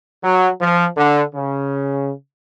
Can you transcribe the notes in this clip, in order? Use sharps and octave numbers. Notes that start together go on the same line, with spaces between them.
F#3
F3
D3
C#3